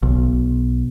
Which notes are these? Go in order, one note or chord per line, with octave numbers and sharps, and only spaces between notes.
B1